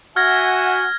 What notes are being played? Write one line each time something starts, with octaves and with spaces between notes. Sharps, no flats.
F#4 E5 F#5 G#5 F6 G#6 A#6